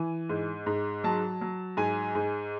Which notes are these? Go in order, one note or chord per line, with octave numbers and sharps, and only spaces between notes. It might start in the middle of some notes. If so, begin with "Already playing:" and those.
Already playing: E3 G#5
G#2
G#2
F#3 A5
F#3
G#2 G#5
G#2